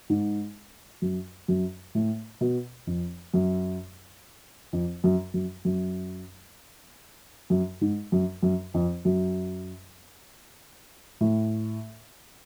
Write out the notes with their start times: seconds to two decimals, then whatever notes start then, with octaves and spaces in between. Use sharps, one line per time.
0.10 G#2
1.02 F#2
1.48 F#2
1.95 A2
2.41 B2
2.87 F2
3.34 F#2
4.73 F2
5.04 F#2
5.34 F#2
5.65 F#2
7.50 F#2
7.81 G#2
8.12 F#2
8.43 F#2
8.74 F2
9.05 F#2
11.21 A2